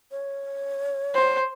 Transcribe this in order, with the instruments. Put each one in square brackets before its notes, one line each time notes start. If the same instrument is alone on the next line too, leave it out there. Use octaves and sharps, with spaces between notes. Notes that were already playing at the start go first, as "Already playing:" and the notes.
[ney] C#5
[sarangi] C5